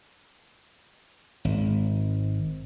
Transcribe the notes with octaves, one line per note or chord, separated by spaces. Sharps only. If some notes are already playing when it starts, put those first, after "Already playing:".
G#1